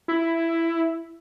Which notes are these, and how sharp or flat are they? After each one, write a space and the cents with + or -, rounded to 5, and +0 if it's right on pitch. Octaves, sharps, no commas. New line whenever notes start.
E4 +10